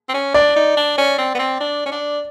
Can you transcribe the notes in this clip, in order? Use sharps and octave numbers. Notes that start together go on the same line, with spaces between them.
C4
C#4
D4 D5
D#4
D4
C#4
C4
B3
C4
D4
C#4
D4